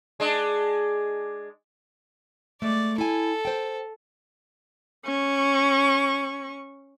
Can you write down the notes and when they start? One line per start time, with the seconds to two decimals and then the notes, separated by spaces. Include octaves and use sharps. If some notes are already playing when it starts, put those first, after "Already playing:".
0.20 G#3 D4
2.62 G#3 A3 D5
2.98 E4 A4 G#5
3.45 C5 G5
5.05 C#4 C#6